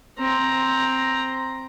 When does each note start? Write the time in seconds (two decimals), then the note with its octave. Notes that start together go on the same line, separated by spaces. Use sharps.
0.19 C4 A#5